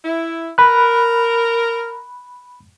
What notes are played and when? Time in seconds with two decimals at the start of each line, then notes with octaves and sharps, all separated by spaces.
0.05 E4
0.58 A#4 B5 F#6